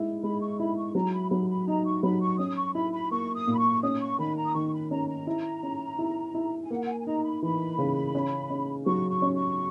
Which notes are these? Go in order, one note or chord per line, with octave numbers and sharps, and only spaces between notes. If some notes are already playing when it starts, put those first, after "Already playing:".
Already playing: G#3 E4
G#3 B5
C#6
E4 B5
C#6
F#3 A#5
B5
F#3 B5
B5
D#4 A#5
C#6
F#3 B5
C#6
C#4 D#6
C#6
E4 B5
B5
A#3 C#6
D#6
A#2
B5
C#6
C#4 D#6
C#6
D#3 B5
A#5
D#6
D#3 C#6
B5
C#4 A#5
A#5
E4
C#4
E4
E4
G#5
A#3 F#5
F#5
G#5
G#5
D#4 A#5
B5
E3 B5
C#3
C#4
C#4
F#3 C#6
C#6
C#4
C#6